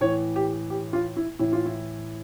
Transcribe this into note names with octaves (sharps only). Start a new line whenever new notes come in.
A2 E3 C#5
G4
G4
F4
E4
A2 E3 E4
F4
E4